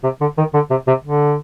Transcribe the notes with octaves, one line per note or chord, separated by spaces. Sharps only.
C3
D3
D#3
D3
C3
C3
D3